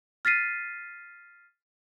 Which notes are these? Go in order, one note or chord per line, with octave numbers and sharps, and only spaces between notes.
F6 A6 B6 C7 D#7